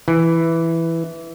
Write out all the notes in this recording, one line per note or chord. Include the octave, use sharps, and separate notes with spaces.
E3